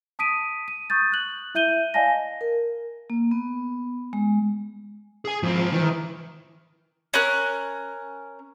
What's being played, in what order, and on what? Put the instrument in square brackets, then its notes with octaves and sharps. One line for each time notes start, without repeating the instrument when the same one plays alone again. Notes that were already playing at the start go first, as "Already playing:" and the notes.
[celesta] A5 D#6 B6 D7 D#7
D#7
C#6 D#6 G6 A6
F#6 F#7
E4 E5 G6 D#7 G7
D5 D#5 F5 G#5 A5 A#6
[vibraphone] A#4
A#3
B3
G#3
[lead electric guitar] G#4 G#5
[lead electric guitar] G#2 C4 [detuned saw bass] F3
[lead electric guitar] D#3 [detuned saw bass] E3
[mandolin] C#4 A#4 F#6